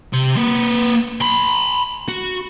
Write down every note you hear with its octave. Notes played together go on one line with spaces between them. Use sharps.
C3 C6
A#3 B4
B5 C6
F#4